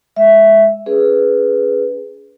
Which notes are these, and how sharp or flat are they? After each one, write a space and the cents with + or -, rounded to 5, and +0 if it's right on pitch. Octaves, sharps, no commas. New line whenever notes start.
G#3 +0 E5 +0
C#4 +35 G#4 +0 B4 +0